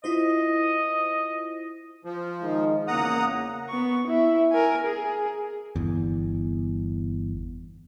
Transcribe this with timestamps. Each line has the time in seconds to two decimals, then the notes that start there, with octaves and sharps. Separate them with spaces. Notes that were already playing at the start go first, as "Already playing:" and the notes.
0.04 E4 F4 C5 D#5
2.05 F3
2.42 D#3 G#3 D#4
2.88 E2 C#3 A#3 F#5 A#5 D#6
3.69 B3 C#6
4.08 E4 E5
4.52 A#4 G#5
4.86 G#4
5.76 G1 E2